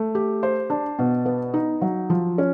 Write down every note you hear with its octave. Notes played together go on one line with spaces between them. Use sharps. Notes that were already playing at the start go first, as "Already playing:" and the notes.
Already playing: A3
G4
C5
D4
B2
B3
D#4
F#3
F3
C#4